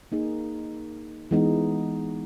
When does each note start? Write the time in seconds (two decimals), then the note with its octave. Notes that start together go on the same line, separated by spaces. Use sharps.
0.12 A#3 D#4 G#4
1.31 E3 G#3 B3 D#4